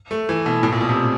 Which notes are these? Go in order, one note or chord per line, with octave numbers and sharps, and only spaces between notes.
A3
E3
B2
A2
A#2
B2
C3